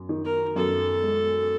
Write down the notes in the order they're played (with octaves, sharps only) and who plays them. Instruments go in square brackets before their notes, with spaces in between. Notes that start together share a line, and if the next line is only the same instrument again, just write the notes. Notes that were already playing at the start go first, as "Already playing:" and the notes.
Already playing: [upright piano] F#2
D#3
[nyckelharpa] A#4
[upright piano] F#2 [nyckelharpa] A4
[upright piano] G#3